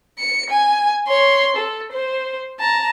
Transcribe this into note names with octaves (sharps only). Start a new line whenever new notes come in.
C#7
G#5
C#5 C6
A4
C5
A5 A#5